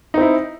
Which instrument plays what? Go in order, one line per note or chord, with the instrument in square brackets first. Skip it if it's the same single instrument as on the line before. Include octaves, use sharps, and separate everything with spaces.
[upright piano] D#4
C4
E4